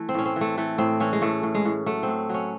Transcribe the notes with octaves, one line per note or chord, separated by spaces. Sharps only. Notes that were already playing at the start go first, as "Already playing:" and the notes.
Already playing: E3 A3
C4
A2 C#4
C4
E3 A3
E3 A3
A2 C4
E3 C#4
G#3
A2 A3
A2
G#3
A2
F#3 A3
A2 C4
F#3 C#4